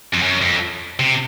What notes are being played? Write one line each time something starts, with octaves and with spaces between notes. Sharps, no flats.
F2
F#2
F2
C3